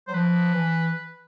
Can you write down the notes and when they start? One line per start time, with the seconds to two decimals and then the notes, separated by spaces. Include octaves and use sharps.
0.08 F#3 C5
0.14 F3 B4
0.54 E3